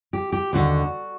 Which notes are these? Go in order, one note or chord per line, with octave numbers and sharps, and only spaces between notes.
G4
G4
D#2 D3 F#4